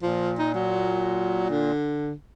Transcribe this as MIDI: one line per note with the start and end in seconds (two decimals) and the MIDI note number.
0.02 1.72 46
0.02 0.33 53
0.39 0.51 63
0.54 1.48 54
1.50 2.13 50